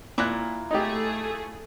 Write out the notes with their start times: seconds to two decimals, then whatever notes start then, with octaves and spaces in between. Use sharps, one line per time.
0.18 A#2 E4 F4 A#5 F#6
0.71 A3 D#4 G4 G#4